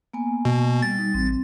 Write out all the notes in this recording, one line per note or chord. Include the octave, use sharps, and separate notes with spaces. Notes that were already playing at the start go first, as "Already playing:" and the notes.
A#3 B3 G#5
B2
G3 A6
G3 D#4
A1 C4